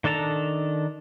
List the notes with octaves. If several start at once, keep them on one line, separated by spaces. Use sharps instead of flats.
D#3 D4 A4 A5 A#5